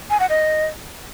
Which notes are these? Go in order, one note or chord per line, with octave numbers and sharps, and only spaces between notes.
G#5
F#5
D#5